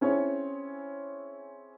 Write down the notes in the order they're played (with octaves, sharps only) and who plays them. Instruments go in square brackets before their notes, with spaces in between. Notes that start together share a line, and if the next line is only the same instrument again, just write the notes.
[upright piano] C4 C#4 E4 G#4 C#5